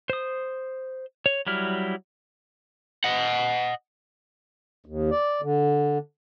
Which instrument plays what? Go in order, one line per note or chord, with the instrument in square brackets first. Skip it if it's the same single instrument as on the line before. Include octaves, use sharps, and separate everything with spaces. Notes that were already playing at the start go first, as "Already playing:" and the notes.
[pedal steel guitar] C5 D#6
C#5
F#3 G3 E4 F6
[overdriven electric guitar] D#5 F#5
[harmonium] D#2
D5
D3